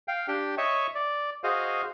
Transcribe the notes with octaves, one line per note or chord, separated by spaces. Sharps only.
F5 G5
D4 G4 G5
C#5 D#5 E5 C#6
D5
F#4 G#4 C5 D#5 F5